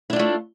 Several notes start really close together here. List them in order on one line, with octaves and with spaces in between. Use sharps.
E4 D4 F4 A3